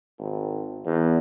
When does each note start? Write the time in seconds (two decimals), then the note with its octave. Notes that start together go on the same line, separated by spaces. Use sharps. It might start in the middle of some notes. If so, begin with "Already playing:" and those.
0.19 G#1
0.86 E2